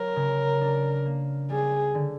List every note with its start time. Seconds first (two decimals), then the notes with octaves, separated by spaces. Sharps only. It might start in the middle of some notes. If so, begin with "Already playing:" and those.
Already playing: F#3 A#4
0.16 C#3
0.61 D4
1.05 A#3
1.50 G3 G#4
1.95 D3